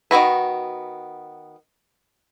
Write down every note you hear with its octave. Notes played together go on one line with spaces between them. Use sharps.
D#3 B3 F#4 B4